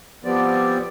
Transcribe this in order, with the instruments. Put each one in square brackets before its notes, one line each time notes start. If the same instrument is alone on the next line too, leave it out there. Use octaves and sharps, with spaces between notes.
[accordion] F3 G3 B3 C4 D5